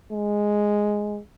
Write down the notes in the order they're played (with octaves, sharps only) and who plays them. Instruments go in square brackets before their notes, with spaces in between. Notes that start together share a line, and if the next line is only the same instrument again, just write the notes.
[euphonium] G#3